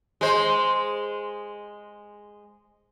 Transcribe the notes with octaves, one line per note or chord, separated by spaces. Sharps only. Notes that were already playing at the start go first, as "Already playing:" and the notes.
G#3 C5